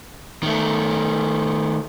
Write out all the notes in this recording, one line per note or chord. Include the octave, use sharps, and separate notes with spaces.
D#3 A3